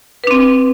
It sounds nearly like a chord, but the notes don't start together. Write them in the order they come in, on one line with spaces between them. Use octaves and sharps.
B4 D4 C4